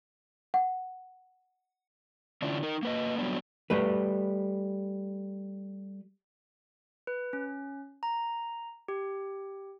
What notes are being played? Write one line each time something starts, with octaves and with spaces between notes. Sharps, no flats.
F#5
D3 C#4 D4 E4 F4
D#4 A#4
A#3 B4 D#5
F#3 G3 B3 D4
G3 A3 B4
B4
C#4
A#5
G4